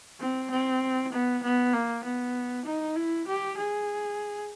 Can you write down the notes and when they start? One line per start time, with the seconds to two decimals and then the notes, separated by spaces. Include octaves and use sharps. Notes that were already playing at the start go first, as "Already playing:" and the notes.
0.20 C4
0.50 C4
1.12 B3
1.43 B3
1.73 A#3
2.03 B3
2.65 D#4
2.96 E4
3.27 G4
3.57 G#4